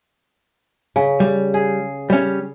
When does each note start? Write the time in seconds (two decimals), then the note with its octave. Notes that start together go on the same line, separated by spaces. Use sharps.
0.96 C#3
1.20 G3
1.54 G#4
2.10 G3 C#4